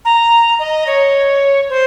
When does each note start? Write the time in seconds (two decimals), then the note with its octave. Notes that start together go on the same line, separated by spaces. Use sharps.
0.05 A#5
0.59 D#5
0.87 C#5
1.69 C5